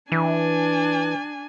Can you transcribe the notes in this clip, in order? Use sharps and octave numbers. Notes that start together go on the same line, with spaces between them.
E3 D4 G#5